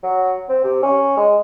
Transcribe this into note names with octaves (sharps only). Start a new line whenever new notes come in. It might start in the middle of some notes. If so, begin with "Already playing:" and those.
F#3
C4
C3
C#4
G#3